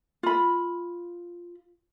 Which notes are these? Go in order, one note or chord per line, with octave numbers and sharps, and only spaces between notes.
F4 B5